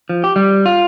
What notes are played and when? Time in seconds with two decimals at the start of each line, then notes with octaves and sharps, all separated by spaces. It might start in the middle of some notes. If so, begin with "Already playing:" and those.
0.09 F3
0.24 G4
0.36 G3
0.66 F4